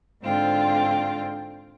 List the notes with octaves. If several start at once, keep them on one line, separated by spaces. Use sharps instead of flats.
G#2 D3 C4 F4 G5